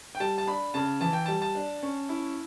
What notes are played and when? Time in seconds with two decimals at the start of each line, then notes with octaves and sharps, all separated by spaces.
0.15 G5
0.20 G3 A5
0.38 A5
0.47 D4 B5
0.74 C#3 A5
1.01 E3 A5
1.13 G5
1.26 G3 A5
1.42 A5
1.55 D4
1.82 C#4
2.09 E4